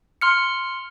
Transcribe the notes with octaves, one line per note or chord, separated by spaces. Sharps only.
C6 F6 C#7